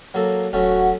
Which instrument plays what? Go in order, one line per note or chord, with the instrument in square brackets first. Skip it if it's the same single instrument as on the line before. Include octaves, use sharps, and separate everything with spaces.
[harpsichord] F#3 A#3 A4
[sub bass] D#1 [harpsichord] F#3 A3 C#4 [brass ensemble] F#4 F#5